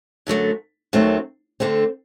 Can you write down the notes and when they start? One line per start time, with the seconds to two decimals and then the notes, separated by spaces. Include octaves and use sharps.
0.27 F#2 D3 F#3 A3
0.93 D#2 D#3 F#3 A3 C4
1.60 D2 D3 A3 C4